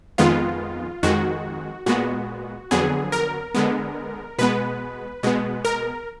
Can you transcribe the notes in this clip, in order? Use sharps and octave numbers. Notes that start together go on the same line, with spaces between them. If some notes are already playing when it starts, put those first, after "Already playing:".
F2 D#3 G#3 B3 F4
F2 D#3 G#3 F#4
A#2 G#3 B3 F#4
F2 D3 F#3 B3 G#4
A#4
D3 G#3 B3
B2 G#3 B3 B4
B2 G#3 B3
A#4